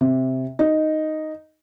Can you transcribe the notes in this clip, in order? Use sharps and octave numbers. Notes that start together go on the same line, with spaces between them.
C3
D#4